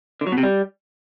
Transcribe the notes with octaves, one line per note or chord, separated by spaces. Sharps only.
D3
F#3
B2
C3
G3